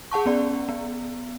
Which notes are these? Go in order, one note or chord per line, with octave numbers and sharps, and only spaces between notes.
G#4 F#5 A5 C#6
B3 C#4 D5
B3